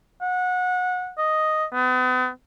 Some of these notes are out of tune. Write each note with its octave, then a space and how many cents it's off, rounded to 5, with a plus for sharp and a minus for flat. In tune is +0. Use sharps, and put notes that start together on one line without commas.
F#5 -25
D#5 +0
B3 +40